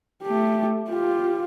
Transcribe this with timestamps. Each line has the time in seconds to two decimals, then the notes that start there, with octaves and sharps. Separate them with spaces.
0.23 A3 G4
0.89 F4 G4